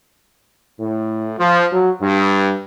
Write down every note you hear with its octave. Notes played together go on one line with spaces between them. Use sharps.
A2
F3
F#3
G2